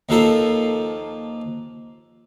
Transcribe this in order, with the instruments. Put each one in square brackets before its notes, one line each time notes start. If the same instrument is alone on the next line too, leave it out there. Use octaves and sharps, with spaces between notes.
[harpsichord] D#2 F3 A#3 A4 C5